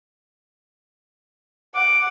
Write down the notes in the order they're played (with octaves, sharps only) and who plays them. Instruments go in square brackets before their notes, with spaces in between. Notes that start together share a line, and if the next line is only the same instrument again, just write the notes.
[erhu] F#5 [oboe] D6